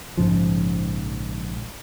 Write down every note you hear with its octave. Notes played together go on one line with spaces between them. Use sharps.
A#1 G#2 C#3 F3